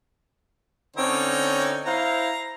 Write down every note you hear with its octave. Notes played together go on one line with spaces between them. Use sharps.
D3 C4 C#4 D#4 C#5
E4 C5 F5 A#5